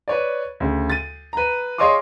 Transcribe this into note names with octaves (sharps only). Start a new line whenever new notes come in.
B4 C#5 D5
D2 C#3
A6 D#7
B4 A#5
G#4 C#5 D#5 F5 C6 D6